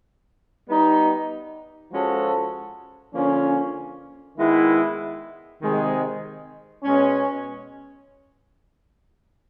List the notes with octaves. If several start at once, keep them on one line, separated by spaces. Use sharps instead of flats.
G3 B3 D#4
F3 G#3 C#4 F#4 A4
D3 F3 A#3 C#4
D#3 G#3 B3 E4
C3 D#3 G#3 C4
B2 G#3 C#4